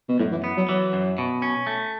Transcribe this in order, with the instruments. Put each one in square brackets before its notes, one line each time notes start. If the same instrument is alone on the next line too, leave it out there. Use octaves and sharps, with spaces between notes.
[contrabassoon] B2
[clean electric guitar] F#2 [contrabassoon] A2
[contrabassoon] E3
[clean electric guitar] B3
[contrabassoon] F#3
[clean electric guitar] E3 [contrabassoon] F#3
[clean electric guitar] F#2
B2
C#4
A3